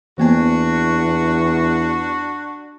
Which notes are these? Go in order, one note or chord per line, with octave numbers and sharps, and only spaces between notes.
E2 E3 A#3 B3 D4 F#4